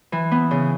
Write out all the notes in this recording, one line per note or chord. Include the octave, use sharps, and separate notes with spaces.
E3
B3
C#3